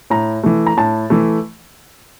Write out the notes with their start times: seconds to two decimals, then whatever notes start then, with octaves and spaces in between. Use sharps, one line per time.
0.10 A2 A#5
0.43 E3 A3
0.67 A#5
0.77 A2 A5
1.10 E3 A3